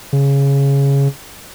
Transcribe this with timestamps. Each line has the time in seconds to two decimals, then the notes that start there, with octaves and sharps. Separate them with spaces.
0.13 C#3